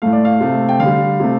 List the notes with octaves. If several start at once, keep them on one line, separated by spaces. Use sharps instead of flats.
A2 A3 F5
D5
F5
C3 A3
G5
D3 F5
G3
C3 A3